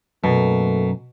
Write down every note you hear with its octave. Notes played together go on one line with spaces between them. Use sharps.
F#2 B2 A3 A#3 A4